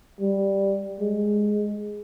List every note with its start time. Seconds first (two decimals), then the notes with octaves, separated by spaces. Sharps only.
0.21 G3
1.01 G#3